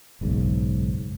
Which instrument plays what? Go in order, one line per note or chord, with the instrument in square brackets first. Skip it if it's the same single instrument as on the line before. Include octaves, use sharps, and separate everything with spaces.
[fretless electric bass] F#1 B1 G#2